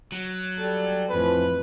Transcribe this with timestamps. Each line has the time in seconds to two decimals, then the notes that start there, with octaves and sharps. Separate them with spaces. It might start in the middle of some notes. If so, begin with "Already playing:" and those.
0.12 F#3
0.59 G3 A4
1.10 F2 A2 E3 F3 B4